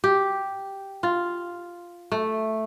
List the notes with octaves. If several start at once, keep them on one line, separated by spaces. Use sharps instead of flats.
G4
F4
A3